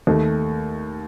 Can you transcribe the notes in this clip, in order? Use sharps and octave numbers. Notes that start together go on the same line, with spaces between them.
D#2 D#3 A3